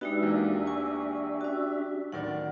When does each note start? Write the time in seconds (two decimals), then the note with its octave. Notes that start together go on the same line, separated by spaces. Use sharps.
0.01 G#3 B3 D4 D#4 F#4 G4 E5
0.23 E2 A#3
0.66 G#5 C#6
1.41 C#4 F#4
2.12 D1 D#3 D5 F#5